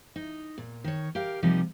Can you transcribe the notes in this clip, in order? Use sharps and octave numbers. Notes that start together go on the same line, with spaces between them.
D#4
A#2
D#3 C#5
G4 A#4 F5
C3 F3 G3 A#3 D#4